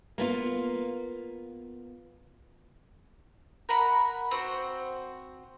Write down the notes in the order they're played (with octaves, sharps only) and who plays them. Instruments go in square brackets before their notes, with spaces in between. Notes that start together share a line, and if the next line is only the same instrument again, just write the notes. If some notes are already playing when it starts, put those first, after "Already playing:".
[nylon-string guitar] A#3 B3 F4
[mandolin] A#4 F#5 B5
C4 F#4 C5